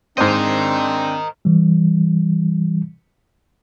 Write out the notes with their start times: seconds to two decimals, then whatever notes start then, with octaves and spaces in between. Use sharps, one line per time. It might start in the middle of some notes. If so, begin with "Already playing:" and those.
0.18 G#2 C4 D4 A#4 C5 D#5
1.45 E3 G3